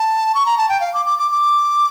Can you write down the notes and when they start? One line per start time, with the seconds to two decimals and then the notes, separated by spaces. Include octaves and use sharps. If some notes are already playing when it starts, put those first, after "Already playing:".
Already playing: A5
0.35 C#6
0.46 A#5
0.58 A5
0.69 G5
0.80 F5
0.94 D6
1.06 D6
1.19 D6
1.32 D6